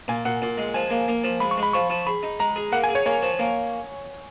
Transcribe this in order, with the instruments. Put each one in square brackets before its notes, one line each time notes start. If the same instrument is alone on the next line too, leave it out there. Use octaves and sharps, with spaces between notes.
[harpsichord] A#2 [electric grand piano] G#5
[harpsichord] A#2 [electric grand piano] F#5
[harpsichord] A#2
G#3
[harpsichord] F3 [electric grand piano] G#5
[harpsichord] A#3
A#3
F3
[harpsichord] G#3 [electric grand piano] B5
[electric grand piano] C#6
[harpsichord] G#3
[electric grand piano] B5
[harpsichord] F3 [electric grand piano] C#6
[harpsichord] F3
[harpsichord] G#4 [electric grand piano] B5
[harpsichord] D#4
[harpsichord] G#3 [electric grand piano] A#5
[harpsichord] G#4
[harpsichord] A#3 [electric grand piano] F#5
[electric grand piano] G#5
[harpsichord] G#4
[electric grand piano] C#5
[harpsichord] A#3 [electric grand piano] C#5
[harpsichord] F3
A#3